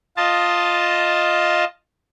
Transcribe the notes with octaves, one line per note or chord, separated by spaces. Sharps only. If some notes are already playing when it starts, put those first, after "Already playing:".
F4 D#5 A5